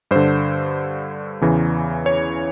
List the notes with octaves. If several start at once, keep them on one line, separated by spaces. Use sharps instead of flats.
G2 D3 C5
E2 C#3 E3
C#5